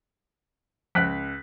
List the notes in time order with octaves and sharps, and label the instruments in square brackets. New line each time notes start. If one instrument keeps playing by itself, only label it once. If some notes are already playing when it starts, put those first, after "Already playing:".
[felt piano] C#2 F#6 B6 [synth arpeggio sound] F3 F#5 D7